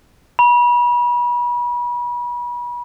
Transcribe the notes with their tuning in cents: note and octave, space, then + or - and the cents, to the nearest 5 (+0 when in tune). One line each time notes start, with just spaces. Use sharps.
B5 -35